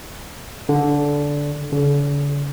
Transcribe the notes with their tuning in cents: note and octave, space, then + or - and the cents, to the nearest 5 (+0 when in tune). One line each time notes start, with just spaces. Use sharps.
D3 -15
D3 -45